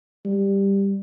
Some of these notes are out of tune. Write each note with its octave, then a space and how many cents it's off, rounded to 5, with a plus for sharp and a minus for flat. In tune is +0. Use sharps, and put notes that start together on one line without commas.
G3 +10